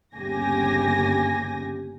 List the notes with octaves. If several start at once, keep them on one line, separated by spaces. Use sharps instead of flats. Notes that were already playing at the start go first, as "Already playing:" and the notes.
G1 D#2 C#3 G4 G#5 A#6